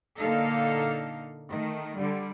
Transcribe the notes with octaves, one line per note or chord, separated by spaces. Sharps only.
A#2 D3 A#3 D#4 A4 F5
D#3 A3
D3 G3